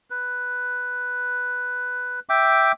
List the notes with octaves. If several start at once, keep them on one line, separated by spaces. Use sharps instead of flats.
B4
E5 G5 D6